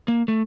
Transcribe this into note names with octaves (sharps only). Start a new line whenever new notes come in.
A#3
A3